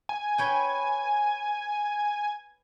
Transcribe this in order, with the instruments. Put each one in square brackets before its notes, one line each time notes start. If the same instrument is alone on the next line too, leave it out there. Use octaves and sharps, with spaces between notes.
[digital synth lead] G#5
[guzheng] B4 C#5 G5